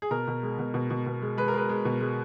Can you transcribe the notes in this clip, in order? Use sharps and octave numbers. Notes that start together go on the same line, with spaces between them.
G#4
B2 A#4
B2
G#3
B2
B2
B2
B2
G#3
G#3 B4
A#4
G#3 B4
G#3
B2
G#3